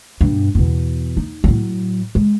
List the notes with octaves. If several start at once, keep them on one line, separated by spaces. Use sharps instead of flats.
G2 B2
E2 B2
D#4
A2 F#3
G#3